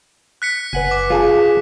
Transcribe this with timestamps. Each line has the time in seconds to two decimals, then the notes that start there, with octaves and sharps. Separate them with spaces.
0.42 F#6 B6 C#7
0.73 F#1 B4 F#5 G#5
0.91 D6
1.10 F4 G#4 A5